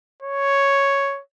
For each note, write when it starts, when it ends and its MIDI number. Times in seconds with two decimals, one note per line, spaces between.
0.22 1.21 73